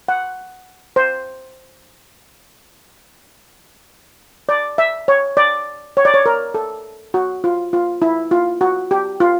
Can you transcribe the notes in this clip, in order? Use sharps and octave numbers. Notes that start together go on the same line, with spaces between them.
F#5
C5
D5
E5
C#5
D5
C#5
D5
C#5
A#4
A4
F#4
F4
F4
E4
F4
F#4
G4
F4